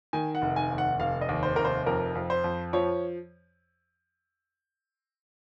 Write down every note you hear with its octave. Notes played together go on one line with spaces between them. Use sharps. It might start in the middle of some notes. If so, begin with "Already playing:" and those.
D#3 G#5
F#5
F1
G#5
D#2
F#5
F1 F5
D#5
D#2
C5
F1 A#4
C5
F2 A#4
F2
C5
F2
F3 C#5